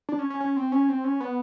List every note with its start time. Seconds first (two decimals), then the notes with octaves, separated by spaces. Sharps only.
0.09 D4
0.19 C#4
0.30 C#4
0.40 C#4
0.57 C4
0.72 C#4
0.89 C4
1.04 C#4
1.20 B3